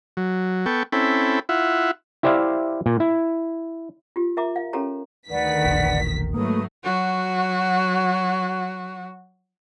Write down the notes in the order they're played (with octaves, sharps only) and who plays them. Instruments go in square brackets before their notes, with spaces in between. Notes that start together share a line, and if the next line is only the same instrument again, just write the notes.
[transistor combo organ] F#3
B3 A4 G5 C#6
C4 C#4 E4 A4 G5 B5
E4 F4 E5 F#5
[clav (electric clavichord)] E4 G4 C5 D5 E5 F5
A#2
E4
[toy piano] F4 G4
A#4 E5 A#5 D6
F5
C#4 G4 A4 A#4 C#5 A#5
[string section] D2 D#3 B6 [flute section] B4 D5 F#5
[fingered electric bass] E1 A#1
[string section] G#2 F#3 A3 [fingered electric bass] A#3 [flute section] B4 D#6
[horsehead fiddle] F#3 F#4